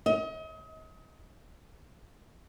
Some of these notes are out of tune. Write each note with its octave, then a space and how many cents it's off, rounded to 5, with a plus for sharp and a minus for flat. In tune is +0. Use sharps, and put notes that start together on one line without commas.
D#5 +35